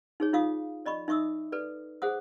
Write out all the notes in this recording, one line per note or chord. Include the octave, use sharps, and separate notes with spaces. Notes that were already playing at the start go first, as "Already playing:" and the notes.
D#4 G#4 C#5
D#4 F4 F5 D#6
D5 D#5 B5 C#6
D#4 E5 C#6 D#6 E6
A4 B4 D5
G#4 C5 F#5 D#6